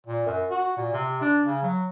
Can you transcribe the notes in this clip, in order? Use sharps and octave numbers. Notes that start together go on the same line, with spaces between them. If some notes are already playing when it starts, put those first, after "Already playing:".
A#2
F#2
F#4
A#2
C3
D4
C#3
F#3